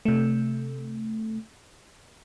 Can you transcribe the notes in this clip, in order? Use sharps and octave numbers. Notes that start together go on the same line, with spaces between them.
C3 A3